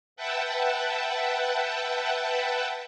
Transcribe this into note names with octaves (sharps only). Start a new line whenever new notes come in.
B4 E5 F#5 G5 A5